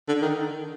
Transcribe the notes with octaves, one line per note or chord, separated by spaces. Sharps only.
D3
D#3